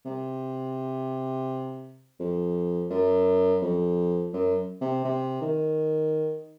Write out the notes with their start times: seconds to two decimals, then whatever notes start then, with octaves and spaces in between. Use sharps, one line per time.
0.05 C3
2.20 F2
2.91 F#2
3.62 F2
4.33 F#2
4.81 C3
5.05 C3
5.41 D#3